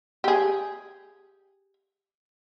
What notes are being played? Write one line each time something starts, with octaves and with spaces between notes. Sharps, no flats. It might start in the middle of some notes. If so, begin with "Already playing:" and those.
G4 G#4